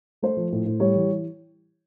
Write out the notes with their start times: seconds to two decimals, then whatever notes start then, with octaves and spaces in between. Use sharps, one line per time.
0.22 A3 C5
0.37 F3
0.52 A2
0.66 A2
0.80 G3 C#5
0.95 E3